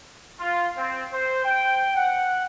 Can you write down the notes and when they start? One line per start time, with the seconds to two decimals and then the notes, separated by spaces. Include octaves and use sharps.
0.40 F4
0.76 C4
1.12 C5
1.44 G5
1.96 F#5